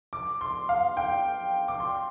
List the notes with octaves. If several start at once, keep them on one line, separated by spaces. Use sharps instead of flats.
D6
C6
F5
G5
D6
C6